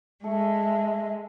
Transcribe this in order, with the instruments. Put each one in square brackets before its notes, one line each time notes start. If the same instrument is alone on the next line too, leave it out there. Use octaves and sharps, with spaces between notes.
[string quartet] G#3 [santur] A4 C#6 [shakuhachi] E5